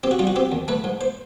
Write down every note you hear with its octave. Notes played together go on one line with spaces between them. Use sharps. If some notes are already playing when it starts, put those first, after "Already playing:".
C4 G4
F#4
G3 F4
F#4
C4 G4
D#2
A3 B4
G#2
C5